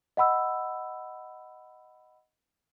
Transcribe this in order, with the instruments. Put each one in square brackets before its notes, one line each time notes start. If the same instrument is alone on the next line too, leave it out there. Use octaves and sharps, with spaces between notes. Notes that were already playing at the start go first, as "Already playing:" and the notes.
[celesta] D#5 F#5 B5 E6